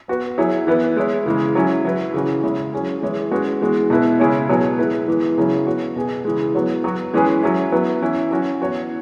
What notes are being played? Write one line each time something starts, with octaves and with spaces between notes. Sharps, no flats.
B3 F#4 B4
F#3 E4 G#4 C#5
E3 B3 E4 B4
G#3 E4 C#5
C#3 E3 G#3
F#3 C#4 E4 G#4
F#3 E4 B4
C#3 E3 C#4 F#4
C#3 G#3 E4 C#5
F#3 C#4 G#4
E3 G#3 E4 C#5
G#3 C#4 F#4 B4
E3 G#3 B3 F#4
B2 B3 E4 B4
C#3 G#3 E4 G#4 C#5
B2 F#3 B3 G#4 C#5
G#3 E4 B4
E3 G#3 B3
C#3 F#3 C#4 E4
B3 F#4 C#5
B2 B3 G#4
C#3 E3 G#3
F#3 B3 F#4 C#5
F#3 B3 F#4
E3 G#3 C#4 G#4 B4
F#3 C#4 E4
F#3 B3 E4 B4
E3 C#4 E4
F#3 C#4 F#4
E3 B3 F#4 C#5